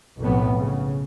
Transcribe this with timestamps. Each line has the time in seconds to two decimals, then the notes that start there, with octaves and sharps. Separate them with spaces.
0.21 B1 F2 A2 B3
0.58 C#3